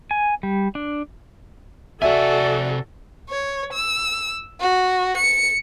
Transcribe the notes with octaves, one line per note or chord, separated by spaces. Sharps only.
G#5
G3
D4
C3 F#4 A4 D5 E5 G#5
C#5
E6
F#4
C#7